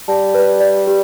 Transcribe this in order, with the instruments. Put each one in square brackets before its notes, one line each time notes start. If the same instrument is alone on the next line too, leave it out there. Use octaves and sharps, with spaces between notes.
[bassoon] G3 [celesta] A5
[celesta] B4
D5
G4